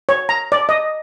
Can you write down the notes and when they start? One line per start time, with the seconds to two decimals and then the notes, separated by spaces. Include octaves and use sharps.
0.09 C#5
0.29 A#5
0.52 D5
0.69 D#5